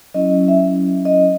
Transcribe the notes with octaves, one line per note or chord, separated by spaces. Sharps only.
F#3 C#4 E4 D#5
E5
D#5